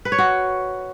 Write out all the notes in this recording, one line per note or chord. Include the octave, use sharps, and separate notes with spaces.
B4
C#5
F#4